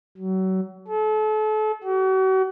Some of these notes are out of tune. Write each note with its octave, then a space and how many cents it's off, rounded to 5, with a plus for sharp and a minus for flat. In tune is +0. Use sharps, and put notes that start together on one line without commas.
F#3 +30
A4 -35
F#4 +40